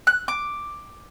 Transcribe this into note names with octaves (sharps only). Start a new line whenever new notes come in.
F#6
D6